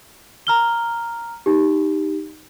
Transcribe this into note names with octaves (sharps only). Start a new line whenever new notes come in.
A#5 F6 G7
D#4 G4